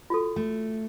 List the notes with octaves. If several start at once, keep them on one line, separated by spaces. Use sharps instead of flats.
F4 F#4 A4
A3